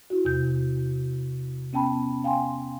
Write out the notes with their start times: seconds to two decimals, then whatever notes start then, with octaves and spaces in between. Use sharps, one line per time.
0.10 E4 F#4
0.25 E2 C3 G6
1.73 B3 C#4 G5 A5 B5
2.24 F5 G5 G#5 C6